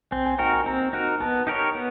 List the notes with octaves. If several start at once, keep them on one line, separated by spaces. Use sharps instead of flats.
C4 G#5
G#5
D#4 F#4 A#4 G5
G#5
C4 A#5
D#4 F#4 A#4
B3 A5
D#4 G4 A#4 C#5
B3